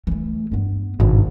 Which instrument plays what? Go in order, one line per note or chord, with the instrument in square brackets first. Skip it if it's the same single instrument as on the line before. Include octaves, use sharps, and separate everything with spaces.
[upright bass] E3 A3
G2 B3
[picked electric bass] G#1 [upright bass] G2 B2